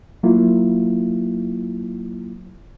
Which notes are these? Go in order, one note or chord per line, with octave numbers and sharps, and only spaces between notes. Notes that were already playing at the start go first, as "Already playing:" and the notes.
F#3 A#3 E4 F4